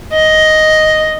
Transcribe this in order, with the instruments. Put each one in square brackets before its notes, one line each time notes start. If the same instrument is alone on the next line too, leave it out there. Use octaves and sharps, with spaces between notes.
[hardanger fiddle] D#5